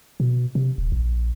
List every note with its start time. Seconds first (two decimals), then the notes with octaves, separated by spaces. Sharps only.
0.20 B2
0.55 C3
0.78 D#1
0.92 A#1